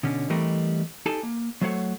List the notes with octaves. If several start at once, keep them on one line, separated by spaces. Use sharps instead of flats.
B2 D3 C#4
E3 G3 A3 C4 A#4 D#5
D#4 G4 A4 G#5 A5
A#3
F#3 A3 C5 C#5 F#5